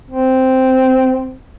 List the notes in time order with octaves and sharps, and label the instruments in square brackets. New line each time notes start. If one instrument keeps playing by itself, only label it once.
[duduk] C4